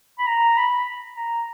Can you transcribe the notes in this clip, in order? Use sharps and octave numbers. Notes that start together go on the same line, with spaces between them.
B5
A#5
B5
A#5